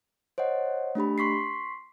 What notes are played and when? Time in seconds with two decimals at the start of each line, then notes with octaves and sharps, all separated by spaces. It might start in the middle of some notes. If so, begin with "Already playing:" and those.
0.38 C5 C#5 D#5 F#5
0.95 A3 D4 G4 B5
1.18 C6 C#6 B6 C7